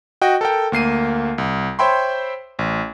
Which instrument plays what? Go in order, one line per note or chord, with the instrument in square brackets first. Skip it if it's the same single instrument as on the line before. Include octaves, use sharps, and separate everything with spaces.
[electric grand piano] F#4 D#5 G5
A4 A#4 G5
D2 A#3 C7 D#7
C2
C5 C#5 E5 G5 B5 C6
A1